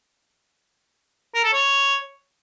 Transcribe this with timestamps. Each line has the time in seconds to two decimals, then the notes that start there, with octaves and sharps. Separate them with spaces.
1.35 A#4
1.44 A4
1.54 C#5